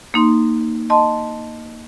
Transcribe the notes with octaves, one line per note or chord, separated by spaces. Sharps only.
A#3 D#4 C6
D#5 A5 C6